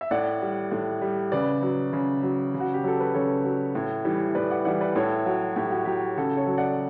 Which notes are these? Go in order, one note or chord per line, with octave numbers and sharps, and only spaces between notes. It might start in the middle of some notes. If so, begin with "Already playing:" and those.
E5
A2 D5 F#5
G3
A2
G3
C#3 B4 D5
F#3
C#3
F#3
C#3
F#4
G4
F#3 A4
B4
C#3 A4 C#5
F#3
A2
E3 G3
A2 B4 D5
D5 F#5
E3 G3 D5 F#5
B4 D5
A2 A4 C#5
F#3 F#4
A2 G4
F#4
F#3 G4
C#3 F#4 A4
A4 C#5
F#3
D5 F#5